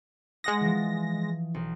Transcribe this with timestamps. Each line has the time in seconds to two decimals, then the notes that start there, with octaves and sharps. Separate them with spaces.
0.44 G#3 F#5 D#6 A#6
0.60 E3 F3
1.54 B1